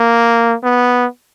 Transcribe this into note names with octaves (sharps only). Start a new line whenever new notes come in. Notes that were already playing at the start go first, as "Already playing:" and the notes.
Already playing: A#3
B3